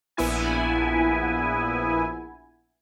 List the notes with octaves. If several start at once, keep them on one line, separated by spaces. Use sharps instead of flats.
A#1 B3 E4 G#5